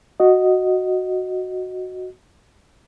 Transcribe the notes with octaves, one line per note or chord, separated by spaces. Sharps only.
F#4 D#5